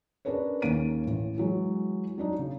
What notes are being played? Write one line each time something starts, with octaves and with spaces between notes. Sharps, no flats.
C#4 D4 G#4 A#4 B4 C#5
D#2 A#3 C#4 D7 D#7
A1
E3 F#3 G#3
F#3 D4 D#4
C#3